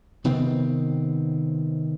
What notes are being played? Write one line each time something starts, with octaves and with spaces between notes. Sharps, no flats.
C3 D#3 B3 C4